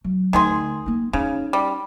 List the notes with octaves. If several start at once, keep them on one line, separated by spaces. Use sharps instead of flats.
F#3
D2 D#3 G#4 C6
A#3 D#4
C#3 C#4 D#4
G3